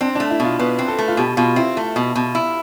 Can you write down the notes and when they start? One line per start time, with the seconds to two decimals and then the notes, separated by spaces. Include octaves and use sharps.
0.01 C4 D4
0.15 D4
0.20 A3
0.30 E4
0.40 B2 F4
0.59 B2 B4
0.79 C4
0.88 A4
0.98 A3
1.08 F4
1.17 B2 G4
1.37 B2 F4
1.56 C4 E4
1.77 A3
1.96 B2
2.16 B2
2.35 E4